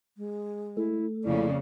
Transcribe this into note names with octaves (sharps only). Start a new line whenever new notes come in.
G#3
A3 E4
F2 C#3 A#3 E4 D5